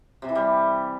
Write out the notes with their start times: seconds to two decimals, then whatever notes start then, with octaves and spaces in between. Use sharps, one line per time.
0.22 C3
0.29 E3
0.35 G3